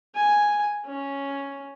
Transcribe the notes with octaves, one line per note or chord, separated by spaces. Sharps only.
G#5
C#4